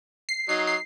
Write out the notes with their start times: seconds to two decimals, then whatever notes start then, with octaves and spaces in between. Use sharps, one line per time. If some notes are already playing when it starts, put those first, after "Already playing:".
0.29 C7
0.49 F#3 D#4 C7
0.67 C7